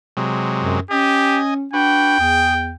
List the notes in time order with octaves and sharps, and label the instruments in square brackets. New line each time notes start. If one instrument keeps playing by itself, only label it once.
[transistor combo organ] C3 F#3 G#3
[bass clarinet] F#2
[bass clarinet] C#4 [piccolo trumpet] G4 [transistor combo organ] D#5 G#5
[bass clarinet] D4 [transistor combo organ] F#4 B4 [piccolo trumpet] G5
[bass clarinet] E2 [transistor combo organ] G#4